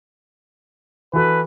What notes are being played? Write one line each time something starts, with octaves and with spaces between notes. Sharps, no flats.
E3 F#4 A4 B4